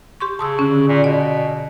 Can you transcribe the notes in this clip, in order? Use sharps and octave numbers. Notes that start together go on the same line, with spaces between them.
G4 C6 C#6
C#3 A5 D#6 E6
D3 C#4
A#2
B2 D5